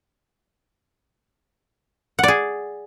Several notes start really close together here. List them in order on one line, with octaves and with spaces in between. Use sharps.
F#5 D5 G#4